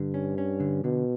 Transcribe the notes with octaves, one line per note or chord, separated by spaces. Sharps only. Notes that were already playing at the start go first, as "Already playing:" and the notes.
Already playing: G2 D3
C#4
C#4
D3
B2 D3